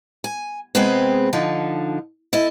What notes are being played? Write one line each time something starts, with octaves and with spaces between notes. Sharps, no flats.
G#5
C3 G#3 B3 C4 G#4 B4
D3 F3 D#4
E4 A4 D#5